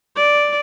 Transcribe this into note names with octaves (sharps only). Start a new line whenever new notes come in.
D5